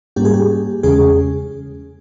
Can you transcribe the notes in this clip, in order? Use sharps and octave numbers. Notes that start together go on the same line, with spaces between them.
G#2 G3 A#3 C#4 G4
G#4
G4
E2 C#3 G#3 C#4 G#4